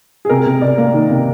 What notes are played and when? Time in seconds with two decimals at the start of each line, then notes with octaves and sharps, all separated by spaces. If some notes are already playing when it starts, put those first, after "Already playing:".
0.25 G#4
0.29 C3 A#4
0.46 C3
0.61 C3 D5
0.78 A#3
0.94 D#3
1.10 C3